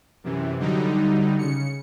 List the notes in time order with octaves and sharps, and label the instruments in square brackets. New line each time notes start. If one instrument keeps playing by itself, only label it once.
[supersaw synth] F#2 C3 E3
D3 F#3 G3 D#4
C#3 C#7